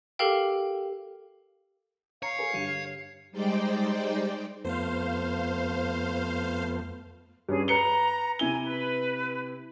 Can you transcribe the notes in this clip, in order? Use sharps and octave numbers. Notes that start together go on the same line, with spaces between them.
G4 A4 A#4 F5 G5
C#5 F5 A#5
A4 A#4 G#5
G2 D3 D#7
G3 G#3 D#4 C5 D5 G5
F2 A3 B3 C5 F5
G2 C#4 G#4
B4 A#5 C#7 G7
C3 E4 G#5 G7
B4